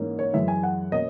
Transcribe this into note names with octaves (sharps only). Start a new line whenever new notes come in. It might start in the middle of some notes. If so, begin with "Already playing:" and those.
Already playing: G#2 E3 A#3 C#4
C#5
F#2 E3 G#3 E5
G#5
F#5
B2 A#3 C#4 D#5